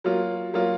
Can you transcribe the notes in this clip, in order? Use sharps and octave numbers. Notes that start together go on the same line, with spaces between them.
F#3 A#3 F4
F#3 A#3 F4